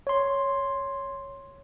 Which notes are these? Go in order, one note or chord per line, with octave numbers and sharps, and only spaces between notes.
C#5 C6